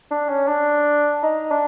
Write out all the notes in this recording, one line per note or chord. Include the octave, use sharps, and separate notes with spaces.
D4
C#4
D4
D#4
D4